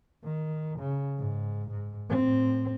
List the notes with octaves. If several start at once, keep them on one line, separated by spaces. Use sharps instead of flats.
D#3
C#3
G#2
G#2
A2 C4